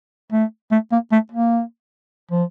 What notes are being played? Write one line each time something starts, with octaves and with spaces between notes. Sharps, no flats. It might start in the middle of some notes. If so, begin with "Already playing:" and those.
A3
A3
A#3
A3
A#3
F3